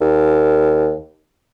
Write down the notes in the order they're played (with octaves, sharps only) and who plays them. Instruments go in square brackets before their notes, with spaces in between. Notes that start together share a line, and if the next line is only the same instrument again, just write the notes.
[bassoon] D#2